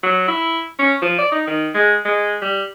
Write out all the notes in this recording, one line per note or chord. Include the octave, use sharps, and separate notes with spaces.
F#3
E4
C#4
F3
D5
D#4
D#3
G#3
G#3
G3